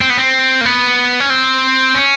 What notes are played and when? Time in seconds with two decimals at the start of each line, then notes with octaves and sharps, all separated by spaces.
0.01 C4
0.10 B3
0.17 C4
0.61 A#3
0.65 B3
1.20 C#4
1.30 C4
1.95 C#4